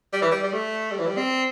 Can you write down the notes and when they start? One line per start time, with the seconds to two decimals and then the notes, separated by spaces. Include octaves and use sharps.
0.13 G3
0.22 E3
0.31 G3
0.43 G3
0.52 A3
0.91 G3
0.99 E3
1.07 G3
1.17 C4